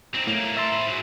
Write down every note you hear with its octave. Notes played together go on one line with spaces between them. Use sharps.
C4 D#4
A2 A3 A#3
A#4 E5 A5 C6
C4 B5
G#2 F#3